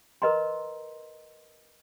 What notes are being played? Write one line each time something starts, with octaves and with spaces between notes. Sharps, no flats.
A#4 B4 D#5 A#5 C6